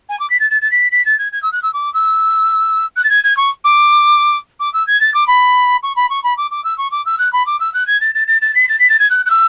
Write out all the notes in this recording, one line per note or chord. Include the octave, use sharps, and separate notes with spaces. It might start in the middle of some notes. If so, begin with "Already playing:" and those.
G#5
D6
B6
A6
A6
A6
B6
B6
A6
G#6
G#6
E6
F#6
E6
D6
E6
F#6
A6
G#6
G#6
C#6
D6
D6
E6
G#6
A6
D6
B5
C#6
B5
C#6
B5
D6
D6
E6
C#6
D6
E6
F#6
B5
D6
E6
F#6
G#6
A6
A6
A6
A6
B6
A6
B6
A6
G#6
F#6
F#6
E6